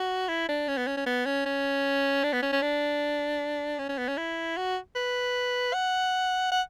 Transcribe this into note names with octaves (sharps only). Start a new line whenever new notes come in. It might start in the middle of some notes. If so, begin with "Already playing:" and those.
Already playing: F#4
E4
D4
C#4
B3
C#4
C#4
B3
C#4
C#4
D4
B3
C#4
C#4
D4
C#4
C#4
B3
C#4
E4
F#4
B4
F#5
F#5